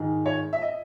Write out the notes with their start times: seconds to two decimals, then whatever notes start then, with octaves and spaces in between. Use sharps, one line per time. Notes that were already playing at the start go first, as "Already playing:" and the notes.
Already playing: G#2 D#3 G#3
0.26 C#5
0.53 E5
0.62 D#5